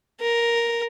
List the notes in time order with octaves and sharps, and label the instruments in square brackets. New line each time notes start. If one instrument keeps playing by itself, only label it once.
[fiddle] A#4